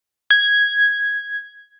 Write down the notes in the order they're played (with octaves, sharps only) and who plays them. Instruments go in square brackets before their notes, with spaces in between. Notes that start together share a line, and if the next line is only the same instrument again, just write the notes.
[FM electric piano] G#6